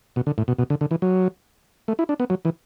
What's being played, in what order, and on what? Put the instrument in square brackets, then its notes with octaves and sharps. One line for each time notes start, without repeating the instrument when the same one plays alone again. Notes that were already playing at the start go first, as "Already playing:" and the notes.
[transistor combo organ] B2
D3
A2
B2
B2
D3
D3
E3
F#3
A3
E4
D4
B3
F#3
E3